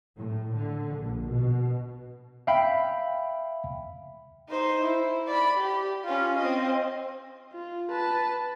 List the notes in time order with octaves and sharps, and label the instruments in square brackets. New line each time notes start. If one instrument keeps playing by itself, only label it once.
[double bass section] A2
D3
A#1
B2
[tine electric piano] E5 F5 G5 B5
[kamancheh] D#4 C5
E4
D5 B5
G4
C#4 F4
C4 D#5
[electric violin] F4
B4 A5